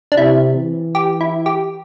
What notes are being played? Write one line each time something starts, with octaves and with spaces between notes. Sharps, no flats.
D4
C3 E4
E3
G4
E4
G4